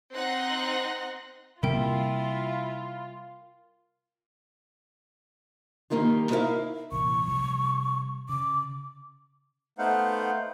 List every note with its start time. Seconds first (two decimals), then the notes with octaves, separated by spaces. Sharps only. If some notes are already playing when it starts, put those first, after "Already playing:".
0.13 C4 D#4 F#5 C6 F#6 A#6
1.63 C3 G3 A#3 E4 F4 A#4 G5
5.90 G2 D#3 G3 A#3 D#4 F4
6.30 D#4 E4 A#4 B4 E5 F5
6.92 C2 A#2 E3 C#6
7.28 C3 F3 G3
8.29 C#3 D6
9.78 A3 B3 D#4 C5 F5 F#5